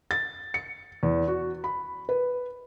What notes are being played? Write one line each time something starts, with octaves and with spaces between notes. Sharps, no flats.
A6
C#7
E2
F#4
B5
B4